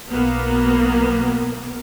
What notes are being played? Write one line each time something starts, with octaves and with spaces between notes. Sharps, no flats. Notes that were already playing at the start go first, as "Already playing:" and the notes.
B1 A#3 B3